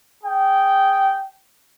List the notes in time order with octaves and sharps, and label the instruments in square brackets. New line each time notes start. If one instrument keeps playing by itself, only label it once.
[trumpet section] G#4 G5